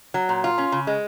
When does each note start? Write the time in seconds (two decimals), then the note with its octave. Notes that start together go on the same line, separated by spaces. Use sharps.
0.14 F#3
0.29 A#2
0.44 F4
0.58 C#4
0.72 C#3
0.87 G#3